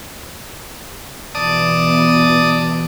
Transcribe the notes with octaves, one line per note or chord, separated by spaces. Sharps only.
B2 E3 B3 D5 A5 D#6